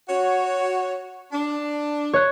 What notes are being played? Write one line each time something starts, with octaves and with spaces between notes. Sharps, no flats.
F#4 C#5
D4
C#5 F#6